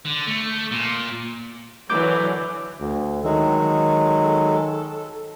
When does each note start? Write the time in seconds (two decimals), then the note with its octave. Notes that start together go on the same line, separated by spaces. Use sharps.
0.05 D3
0.27 A3
0.72 A#2
1.90 D3 E3 F#3 D6 G6
2.80 D2
3.24 D#3 F#3 G#3 A4